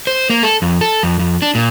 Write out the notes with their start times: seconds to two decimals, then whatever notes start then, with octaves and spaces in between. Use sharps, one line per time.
0.07 C5
0.30 A#3
0.43 A4
0.62 F2
0.81 A4
1.03 F2
1.19 F2
1.42 D4
1.55 A#2